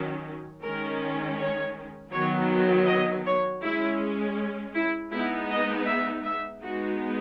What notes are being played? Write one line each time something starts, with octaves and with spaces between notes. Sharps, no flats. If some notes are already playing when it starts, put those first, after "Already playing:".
Already playing: D#3 F#3 C#4
D#3 G#3 C#4 A#4
C#5
D#3 F#3 B3 C#5
D#5
C#5
G#3 C#4 E4
E4
G#3 B3 D#4 E4
D#5
E5
E5
G#3 B3 D#4 F#4